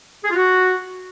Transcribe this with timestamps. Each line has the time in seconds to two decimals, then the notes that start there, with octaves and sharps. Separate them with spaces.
0.24 G#4
0.30 F4
0.36 F#4